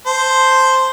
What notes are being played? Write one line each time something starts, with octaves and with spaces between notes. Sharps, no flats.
C5 A5